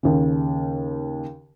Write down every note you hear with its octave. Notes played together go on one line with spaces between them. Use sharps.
D#2 C#3